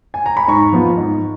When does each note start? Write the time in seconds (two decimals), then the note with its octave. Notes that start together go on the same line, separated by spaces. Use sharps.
0.14 G#5
0.26 A#5
0.37 B5
0.48 G#2 A#5 C#6
0.72 F3 B3 F4
0.97 G#2